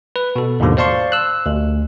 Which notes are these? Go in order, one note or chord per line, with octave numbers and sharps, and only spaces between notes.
B4
B2 A4
D#2 G#2 B2 D3 F3
C5 D5 F5 A5 C6 C#6
E6 F#6
D2